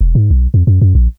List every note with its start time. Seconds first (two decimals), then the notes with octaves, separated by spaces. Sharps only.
0.01 E1
0.15 G#2
0.31 B1
0.54 F2
0.67 F#2
0.81 F#2
0.95 A#1